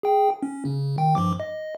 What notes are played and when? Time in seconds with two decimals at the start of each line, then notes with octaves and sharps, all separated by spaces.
0.03 G#4 G5
0.43 C#4
0.65 C#3
0.98 D#3 G5
1.15 G2 F3 D6
1.40 D#5